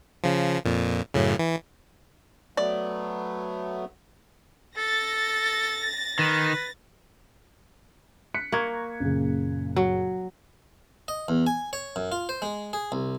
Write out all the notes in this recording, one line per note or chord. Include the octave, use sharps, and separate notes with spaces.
C#3 F3
F2 A#2
F#2 A2 C#3
E3
F#3 A3 B3 D5
A4 A6 A#6
D#3 B4
F#6 B6 C#7
A#3 A#5 C#6 G#6
F#1 A#2 C#3
F#3
D#5
E2
G#5
C#5
F#2
F4
C5
G#3
G#4
C2